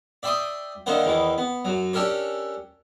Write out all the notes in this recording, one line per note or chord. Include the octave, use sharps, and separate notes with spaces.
D5 E5 G5 C6 D6 D#6
D3 D#3 A#3 C5 C#5 F#5
E2 D#3 E3
B3
F#2 F#3
C#4 D4 G4 A4 A#4 C#5